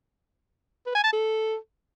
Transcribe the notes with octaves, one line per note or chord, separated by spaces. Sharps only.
B4
G#5
A5
A4